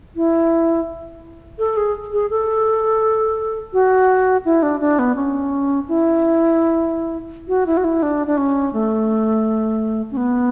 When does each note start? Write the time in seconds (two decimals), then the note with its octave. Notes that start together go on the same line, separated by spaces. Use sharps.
0.16 E4
1.59 A4
1.77 G#4
2.13 G#4
2.30 A4
3.73 F#4
4.45 E4
4.63 D4
4.80 D4
4.99 B3
5.16 C#4
5.88 E4
7.48 F#4
7.66 E4
7.77 F#4
7.84 E4
8.03 D4
8.27 D4
8.37 C#4
8.73 A3
10.11 C#4
10.17 B3